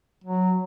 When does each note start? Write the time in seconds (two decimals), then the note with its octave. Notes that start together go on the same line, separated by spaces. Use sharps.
0.24 F#3